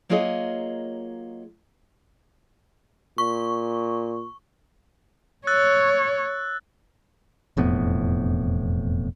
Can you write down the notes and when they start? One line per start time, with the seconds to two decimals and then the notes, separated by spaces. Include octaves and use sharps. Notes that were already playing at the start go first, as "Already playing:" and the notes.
0.09 F#3 A#3 F4 G#4 C#5 D#5
3.18 A#2 C#6
5.47 C#5 E6 F#6 A6
7.57 E1 F2 A2 B3